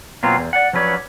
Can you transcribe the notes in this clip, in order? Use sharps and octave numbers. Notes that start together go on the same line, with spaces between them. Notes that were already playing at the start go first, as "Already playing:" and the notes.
B2 F#3 A#3 C4 F4
E2
D5 F#5
F3 F#3 C#4 B4 C#5 D5